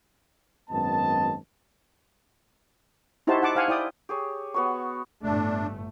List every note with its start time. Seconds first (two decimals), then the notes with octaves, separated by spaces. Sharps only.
0.70 G#1 F#2 B3 D#5 A5
3.27 D#4 E4 F#4 G4 C5 A5
3.42 F#5 A5 D6
3.56 C5 F5 F#5 G#5
3.68 E4 D5 G5 D#6
4.09 G4 G#4 C#5
4.54 B3 F#4 C#5 C#6
5.23 G1 A2 A3 D4